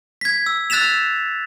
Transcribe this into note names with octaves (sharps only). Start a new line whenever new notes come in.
G#6 B6
E6
E6 F#6 A6 B6 E7 F7